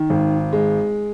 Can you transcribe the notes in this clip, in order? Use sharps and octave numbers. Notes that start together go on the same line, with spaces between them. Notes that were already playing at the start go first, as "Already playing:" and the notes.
Already playing: D#3
G#1
G#3